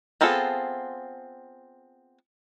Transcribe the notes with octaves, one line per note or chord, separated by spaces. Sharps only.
B3 C4 F4 G#4 A4